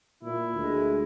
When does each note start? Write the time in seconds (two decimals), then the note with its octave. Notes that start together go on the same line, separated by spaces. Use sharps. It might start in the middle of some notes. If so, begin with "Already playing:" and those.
0.23 A#2 E4
0.54 D2 G#3